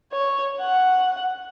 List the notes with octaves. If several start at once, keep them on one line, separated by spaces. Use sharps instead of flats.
C#5
F#5